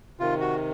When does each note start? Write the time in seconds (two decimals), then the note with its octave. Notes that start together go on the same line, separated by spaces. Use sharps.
0.19 C3 D#3 F4
0.40 F#4